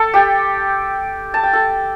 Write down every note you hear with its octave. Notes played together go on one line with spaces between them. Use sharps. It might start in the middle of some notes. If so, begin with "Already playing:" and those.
Already playing: A4 A5
G4 G5
A5
G5
A4 A5